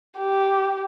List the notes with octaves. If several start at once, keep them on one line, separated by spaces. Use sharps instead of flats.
G4